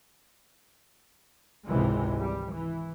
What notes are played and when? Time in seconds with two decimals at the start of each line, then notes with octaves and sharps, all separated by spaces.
1.66 G#1 C#2 C3 E3 G#3
2.19 G3
2.52 E3